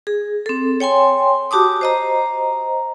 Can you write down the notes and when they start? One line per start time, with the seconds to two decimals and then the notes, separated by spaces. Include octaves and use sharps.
0.07 G#4
0.46 C4 A4
0.80 C#5 G5 G#5 C6
1.51 F#4 G4 A5 D6 D#6
1.81 C5 D#5 A#5